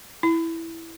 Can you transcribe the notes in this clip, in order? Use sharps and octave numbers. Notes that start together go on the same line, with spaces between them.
E4